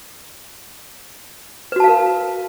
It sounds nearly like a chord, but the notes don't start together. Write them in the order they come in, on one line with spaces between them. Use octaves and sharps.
B4 F#4 A5 F5 A#4